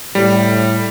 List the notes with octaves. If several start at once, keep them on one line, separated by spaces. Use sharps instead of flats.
A2 G3